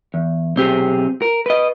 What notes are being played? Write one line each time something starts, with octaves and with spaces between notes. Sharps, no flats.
E2
B1 C4 G4 G#4
A#4
B4 D#5